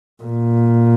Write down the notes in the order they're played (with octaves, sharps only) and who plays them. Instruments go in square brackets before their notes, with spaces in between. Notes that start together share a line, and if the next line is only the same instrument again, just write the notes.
[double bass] A#2